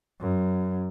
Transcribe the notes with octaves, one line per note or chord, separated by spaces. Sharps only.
F#2